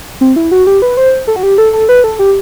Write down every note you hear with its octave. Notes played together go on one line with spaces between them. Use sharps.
C4
E4
F#4
G4
B4
C5
A4
F#4
G4
A4
A4
B4
A4
G4